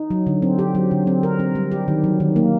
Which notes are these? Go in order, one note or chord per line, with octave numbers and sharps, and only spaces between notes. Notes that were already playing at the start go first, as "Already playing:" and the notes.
Already playing: D#4
F#3
D3
C4
G4
F#3
D3
C4
A#4
C4
G3
G4
D#3
F#3
D#3
A#3